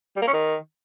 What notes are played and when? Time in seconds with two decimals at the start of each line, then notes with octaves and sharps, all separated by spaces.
0.16 G3
0.22 A#3
0.27 C#4
0.33 D#3